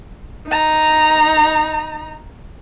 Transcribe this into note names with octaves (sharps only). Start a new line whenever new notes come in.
D#4 A#5